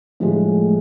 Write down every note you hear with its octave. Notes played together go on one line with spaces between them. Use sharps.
A2 F3 G#3